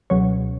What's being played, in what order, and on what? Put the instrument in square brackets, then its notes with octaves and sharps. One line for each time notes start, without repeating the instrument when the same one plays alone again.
[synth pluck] C#2 B2 F#3 C#5